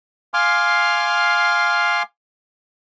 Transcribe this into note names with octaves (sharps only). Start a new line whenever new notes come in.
F5 G#5 C6 D6 F6